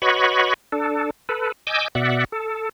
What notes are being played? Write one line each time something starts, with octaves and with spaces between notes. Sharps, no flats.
F#4 B4 C#5 D#5 B5 C#6
D4 A4
A4 B4
D#5 G#5 D6 E6 G6
B2 D5 E5 F#5
A4